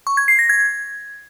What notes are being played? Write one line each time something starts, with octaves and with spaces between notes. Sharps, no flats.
C#6
G#6
C7
A#6
G#6